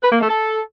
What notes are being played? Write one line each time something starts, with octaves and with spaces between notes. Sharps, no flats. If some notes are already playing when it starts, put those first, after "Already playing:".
B4
A#3
A3
A4